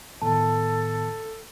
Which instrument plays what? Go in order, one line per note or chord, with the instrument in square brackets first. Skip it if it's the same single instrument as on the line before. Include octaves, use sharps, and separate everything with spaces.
[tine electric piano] A2 D#3 B3 [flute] A4 [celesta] A5